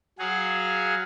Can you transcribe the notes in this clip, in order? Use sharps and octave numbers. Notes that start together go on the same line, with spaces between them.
F#3 F#4 G#4 F5